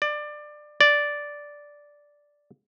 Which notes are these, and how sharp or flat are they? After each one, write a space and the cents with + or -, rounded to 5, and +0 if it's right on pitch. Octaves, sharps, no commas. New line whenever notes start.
D5 +20
D5 -5